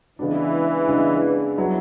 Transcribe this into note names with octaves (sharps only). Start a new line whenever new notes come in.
C#3 E3 G#3 B3 D4
C#3 G#3 B3 D4
F#3 B3 E4